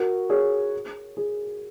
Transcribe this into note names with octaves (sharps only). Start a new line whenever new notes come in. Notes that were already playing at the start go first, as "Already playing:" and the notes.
Already playing: F#4 A#4
G#4 C#5
G#4